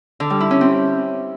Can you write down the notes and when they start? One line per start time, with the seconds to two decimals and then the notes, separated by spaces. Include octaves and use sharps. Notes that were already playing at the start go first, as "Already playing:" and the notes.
0.20 D3
0.30 G3
0.40 E4
0.51 C#4
0.61 C4